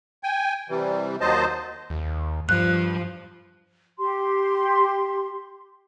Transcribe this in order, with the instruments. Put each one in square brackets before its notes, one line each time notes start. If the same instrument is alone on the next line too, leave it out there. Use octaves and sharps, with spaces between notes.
[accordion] G5 G#5
C3 E3 G3
D#2 F#3 C5 D#5 A5
[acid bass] D#2
[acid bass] G2 [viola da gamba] F3 [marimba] F#6
[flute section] G4 C6